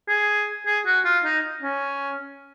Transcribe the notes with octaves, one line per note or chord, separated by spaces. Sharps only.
G#4
G#4
F#4
F4
D#4
C#4